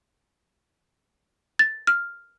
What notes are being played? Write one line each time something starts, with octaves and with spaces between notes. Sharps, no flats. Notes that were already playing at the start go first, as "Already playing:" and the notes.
A6
F6